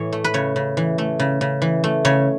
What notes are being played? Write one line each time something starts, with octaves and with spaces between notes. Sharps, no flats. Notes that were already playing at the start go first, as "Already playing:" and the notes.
Already playing: A2 E3 C#5
A3
B4
C#3 C#5
C#3
E3
A3
C#3
C#3
E3
A3
C#3 C#5